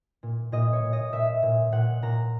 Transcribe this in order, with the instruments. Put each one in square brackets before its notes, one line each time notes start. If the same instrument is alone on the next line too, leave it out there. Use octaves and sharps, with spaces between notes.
[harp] A#2
A#2 D#5
C#5
A#2
D#5
A#2 E5
A#2
A#2 F#5
A#2 A#5